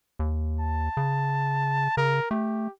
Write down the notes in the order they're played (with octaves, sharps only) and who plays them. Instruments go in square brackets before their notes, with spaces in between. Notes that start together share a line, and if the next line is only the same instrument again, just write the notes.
[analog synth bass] D#2
[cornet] A5
[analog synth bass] C#3
[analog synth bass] C#3 [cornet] A#4
[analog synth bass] A3 [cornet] G4